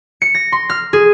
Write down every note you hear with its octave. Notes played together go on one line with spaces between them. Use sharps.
C#7
A#6
C6
F6
G#4